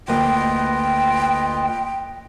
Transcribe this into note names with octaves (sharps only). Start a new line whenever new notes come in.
D2 A#3 F4 B4 D#5 G5